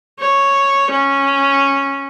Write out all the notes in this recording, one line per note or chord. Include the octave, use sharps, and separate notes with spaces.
C#5
C#4